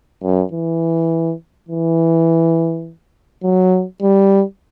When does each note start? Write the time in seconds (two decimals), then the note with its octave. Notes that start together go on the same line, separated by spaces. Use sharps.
0.23 F#2
0.51 E3
1.69 E3
3.43 F#3
4.02 G3